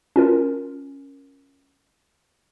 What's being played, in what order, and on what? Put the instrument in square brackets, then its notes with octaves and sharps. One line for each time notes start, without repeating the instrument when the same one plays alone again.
[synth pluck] C#4 F4 A#4